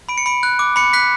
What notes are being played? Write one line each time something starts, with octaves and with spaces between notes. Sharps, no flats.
B5 D7
C#7
B5 D7
F#6
D6
B5 C#7
F#6 B6